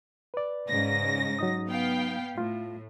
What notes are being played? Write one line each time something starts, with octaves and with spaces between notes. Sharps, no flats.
B4 D5
G#2 C#3 A#6
F#3 D#4 D#6
B3 F5 G5
A2 F4